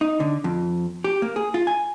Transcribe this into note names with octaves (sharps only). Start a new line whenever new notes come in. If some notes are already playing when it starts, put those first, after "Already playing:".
D#4
D3
F2
G4
A#3
G#4
F4
G#5